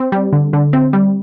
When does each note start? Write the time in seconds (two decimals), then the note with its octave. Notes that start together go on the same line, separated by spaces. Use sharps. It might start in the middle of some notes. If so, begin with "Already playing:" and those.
Already playing: C4
0.12 G3
0.33 D3
0.53 D3
0.73 C4
0.93 G3